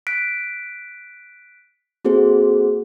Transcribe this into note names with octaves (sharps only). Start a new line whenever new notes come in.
F#6 B6 D7
A#3 C4 F#4 G#4 A4 C5